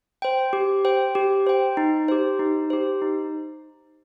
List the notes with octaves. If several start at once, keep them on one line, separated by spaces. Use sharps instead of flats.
C5 G5
G4
C5 G5
G4
C5 G5
D#4
G4 C5
D#4
G4 C5
D#4